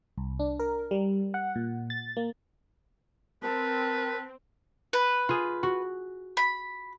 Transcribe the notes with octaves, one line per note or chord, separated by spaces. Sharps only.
C2
D4
A#4
G3
F#5
A#2
A6
A#3
C4 A#4 B4 A5
B4
F4 G#4
F#4
B5